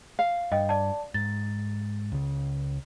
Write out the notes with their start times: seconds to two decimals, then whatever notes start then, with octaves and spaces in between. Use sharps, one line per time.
0.19 F5
0.52 G2 D#5 G5
0.69 D5 A5
1.14 G#2 A6
2.12 C#2 C#3